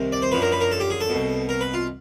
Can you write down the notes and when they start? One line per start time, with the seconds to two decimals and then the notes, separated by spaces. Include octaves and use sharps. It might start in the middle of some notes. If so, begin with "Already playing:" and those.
Already playing: C2 C3 D#3
0.12 D5
0.22 C5
0.32 F#2 D3 F3 B4
0.42 A#4
0.52 B4
0.61 A#4
0.71 A4
0.80 G4
0.90 G#4
1.01 A4
1.09 C2 B2
1.49 A#4
1.61 B4
1.74 F4